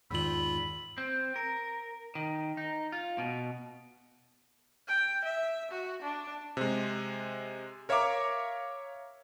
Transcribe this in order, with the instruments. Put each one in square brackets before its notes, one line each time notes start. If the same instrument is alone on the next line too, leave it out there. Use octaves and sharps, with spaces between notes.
[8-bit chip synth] E2 F4 [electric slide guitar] G#2 D#3 D5 [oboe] B5 [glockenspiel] E6 F#7
[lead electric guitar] C4
A#4
D#3
D#4
F4
B2
[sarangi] G5
E5
F#4
D4
[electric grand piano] C3 G#3
A#4 C#5 E5 F5 A#5 D6